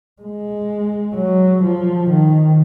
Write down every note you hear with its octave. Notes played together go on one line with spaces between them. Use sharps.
G#3
F#3
F3
D#3